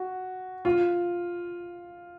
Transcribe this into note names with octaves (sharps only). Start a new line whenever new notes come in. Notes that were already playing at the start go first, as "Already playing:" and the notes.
Already playing: F#4
F4